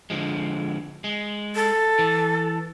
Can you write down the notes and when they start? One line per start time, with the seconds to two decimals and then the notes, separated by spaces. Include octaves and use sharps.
0.10 D3 F3 G#3
1.04 G#3
1.55 A4
1.99 E3